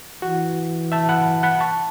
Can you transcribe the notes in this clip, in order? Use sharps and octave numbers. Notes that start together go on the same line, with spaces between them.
E3 F#4
E5 A5
F#5 B5
F#5 B5
A5 C#6